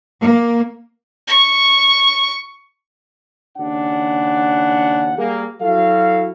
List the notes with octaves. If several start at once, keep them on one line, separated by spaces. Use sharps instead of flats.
A#3
C#6
D#2 C#3 D4 F#5
G3 A#3 G#4
F#3 E4 F#4 A4 F5